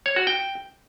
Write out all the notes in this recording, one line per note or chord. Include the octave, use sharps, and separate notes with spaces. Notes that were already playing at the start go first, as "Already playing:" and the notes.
C#5
F#4
G5